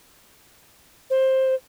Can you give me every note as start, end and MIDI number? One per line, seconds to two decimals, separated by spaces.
1.10 1.55 72